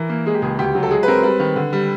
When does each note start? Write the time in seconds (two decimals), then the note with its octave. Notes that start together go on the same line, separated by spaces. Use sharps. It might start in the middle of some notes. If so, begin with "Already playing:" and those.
Already playing: E3 A#4
0.10 A#3
0.26 G#3 G#4
0.34 G4
0.42 C#2 G#4
0.59 D2 G4
0.75 F#3
0.83 A4
0.91 G#3 G#4
1.03 B4
1.08 C4 A#4
1.23 G3 B4
1.40 D#3
1.56 D3
1.73 G3